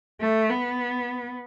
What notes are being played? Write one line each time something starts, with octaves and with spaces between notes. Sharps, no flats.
A3
B3